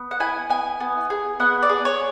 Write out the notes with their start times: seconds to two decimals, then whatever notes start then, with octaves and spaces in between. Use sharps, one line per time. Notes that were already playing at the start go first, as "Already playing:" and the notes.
Already playing: B3
0.11 F#5
0.20 E4 G#5
0.49 B3 G#5
0.80 B3
1.10 G#4
1.40 B3 F#5
1.63 D5
1.69 G#4
1.85 C#5